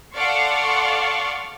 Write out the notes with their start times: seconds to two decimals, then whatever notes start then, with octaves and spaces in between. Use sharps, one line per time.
0.15 A4 D5 F5 F#5 C6 C#6